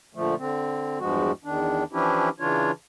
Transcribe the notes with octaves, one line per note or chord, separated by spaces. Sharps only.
A#2 D3 F3 A3
D3 C4
E2 G2 F3 G#3 F#4
E2 D#3 D4
E3 F3 C#4 D4 E4 G4
C#3 E3 D4 F4 C#5